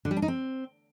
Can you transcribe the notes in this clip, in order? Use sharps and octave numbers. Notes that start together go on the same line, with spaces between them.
D3
G3
D4
D#4
C4